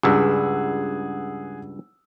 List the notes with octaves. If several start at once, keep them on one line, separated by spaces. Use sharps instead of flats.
C#2 G2 G#4 F#5 E6